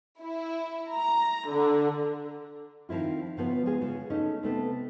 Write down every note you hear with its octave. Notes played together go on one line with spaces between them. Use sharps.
E4
A#5
D3
D#3 F3 C4 E4 F4
C#3 F3 B3
G#3 F4 G#4
C#3
A3 C#4 D#4
C3 A3 B3